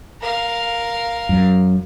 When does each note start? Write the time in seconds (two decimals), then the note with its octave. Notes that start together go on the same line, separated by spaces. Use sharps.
0.21 A#4 F5
1.29 F#2